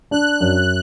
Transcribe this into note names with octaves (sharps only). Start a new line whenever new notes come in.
D4 F#6
F#2